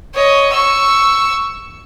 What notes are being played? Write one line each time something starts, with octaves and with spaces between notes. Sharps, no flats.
C#5 D#5
C#6 E6